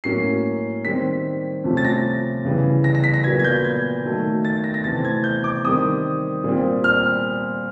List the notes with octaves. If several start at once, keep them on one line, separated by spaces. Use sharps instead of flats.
A2 F#3 A#3 C#4 C7
D#3 G3 C4 B6
C3 F3 A3 C#4
A6
A#6
C#3 E3 G3
A#6
A#6
B6
A#6
A#2 F#3 B3 G#6
G#6
G6
G#6
D#3 F#3 A3
A6
A#6
A#6
C3 E3 A3 C4 A6
G#6
G6
D6
D#3 G3 C4 D#6
A#2 G3 C4
F6